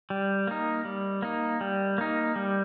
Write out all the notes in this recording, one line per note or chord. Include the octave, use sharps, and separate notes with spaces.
G3
A#3 D#4
G3
A#3 D#4
G3
A#3 D#4
G3